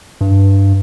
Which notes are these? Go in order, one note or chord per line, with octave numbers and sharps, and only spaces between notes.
G2